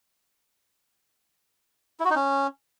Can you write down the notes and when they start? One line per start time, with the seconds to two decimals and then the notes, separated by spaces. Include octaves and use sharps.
2.00 E4
2.05 F#4
2.10 D#4
2.15 C#4